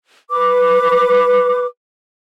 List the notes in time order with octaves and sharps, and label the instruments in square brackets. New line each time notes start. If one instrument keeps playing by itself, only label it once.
[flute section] B4 D6